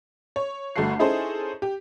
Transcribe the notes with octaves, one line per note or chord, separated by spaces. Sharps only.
C#5
G1 A3 F#4 A4 F#5 C7
C#4 D#4 E4 G#4 A4 C5
G4